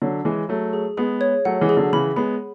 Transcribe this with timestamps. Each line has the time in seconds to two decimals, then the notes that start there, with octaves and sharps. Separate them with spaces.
0.02 D3 F#3 C#5
0.25 E3 G#3 G#4
0.49 F#3 A3 G#4
0.73 G#4
0.97 G#3 B3 G#4
1.21 C#5
1.45 F#3 A3 F#5
1.61 E3 G#3
1.69 G#4
1.77 D3 F#3
1.93 C#3 E3 B5
2.16 G#3 B3 B5